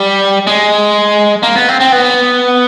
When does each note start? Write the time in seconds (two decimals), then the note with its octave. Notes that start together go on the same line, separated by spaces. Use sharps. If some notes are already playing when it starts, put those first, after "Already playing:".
Already playing: G3
0.47 G#3
1.43 A#3
1.56 B3
1.68 C4
1.80 C4
1.92 B3